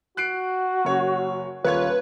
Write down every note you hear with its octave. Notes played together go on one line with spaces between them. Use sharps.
F#4 F#6 C7 D7
F#1 C#5
D#1 F4 B4 C#5 G#6